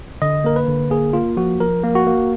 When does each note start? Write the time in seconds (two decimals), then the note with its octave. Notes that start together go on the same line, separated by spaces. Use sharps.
0.22 D3 D#5
0.44 A#3 A#4
0.56 B4
0.68 D3
0.90 A#3 G#4
1.13 A#3 F4
1.37 F3 F#4
1.60 F3 A#4
1.84 A#3
1.95 F#4
2.07 A#3